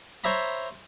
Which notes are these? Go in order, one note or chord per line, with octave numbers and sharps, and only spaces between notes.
C5 C#5 E5 A#5 B5